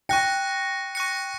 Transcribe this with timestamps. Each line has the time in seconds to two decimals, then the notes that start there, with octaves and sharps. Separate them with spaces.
0.09 G5 C#6 F#6 A#6 C#7
0.95 C#6 F#6 A#6 C#7